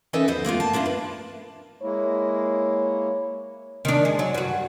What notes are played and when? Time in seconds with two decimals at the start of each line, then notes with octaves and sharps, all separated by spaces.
0.13 E3 C#4 D#4 A4 D#5 E5
0.28 E2 B3 C5
0.45 G#3 A#3 B3 F4
0.60 A5
0.73 A#3 D4 E4 F4
0.86 B4
1.82 G#3 A#3 E4 C#5
3.85 D#3 D4
4.05 G#3
4.19 F#3
4.34 G2 F#4